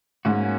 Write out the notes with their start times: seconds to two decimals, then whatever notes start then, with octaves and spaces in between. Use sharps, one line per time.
0.25 G#2 A#3 C#4 F#4